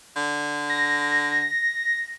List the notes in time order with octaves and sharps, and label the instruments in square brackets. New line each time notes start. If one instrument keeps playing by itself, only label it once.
[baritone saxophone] D3
[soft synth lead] A#6